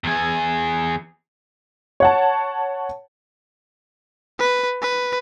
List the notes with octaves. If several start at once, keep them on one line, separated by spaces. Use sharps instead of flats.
E2 G#4
C#5 F#5 A5
B4
B4